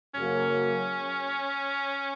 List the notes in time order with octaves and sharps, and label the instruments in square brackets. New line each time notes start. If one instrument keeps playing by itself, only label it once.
[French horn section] F#2 C#3 F#3 A#3 [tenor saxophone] C#4